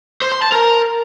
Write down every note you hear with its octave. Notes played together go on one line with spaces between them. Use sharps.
C5
C6
A5
A#4